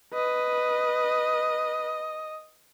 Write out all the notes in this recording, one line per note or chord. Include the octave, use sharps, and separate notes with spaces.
B4 D#5